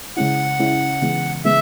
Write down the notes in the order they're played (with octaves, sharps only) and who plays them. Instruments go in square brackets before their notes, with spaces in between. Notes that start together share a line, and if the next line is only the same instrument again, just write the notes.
[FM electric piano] C#3 G#3 C#4 E4 [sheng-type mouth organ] F#5
[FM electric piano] C#3 G#3 C#4 E4
C#3 E3 G#3 B3
[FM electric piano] C#3 E3 G#3 B3 [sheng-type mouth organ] E5